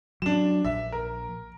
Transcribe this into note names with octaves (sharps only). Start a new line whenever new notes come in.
F#3 D4 E7
A#1 E5
A#4